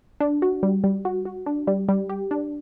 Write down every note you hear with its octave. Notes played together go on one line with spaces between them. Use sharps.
D4
F#4
G3
G3
F#4
F#4
D4
G3
G3
G4
D4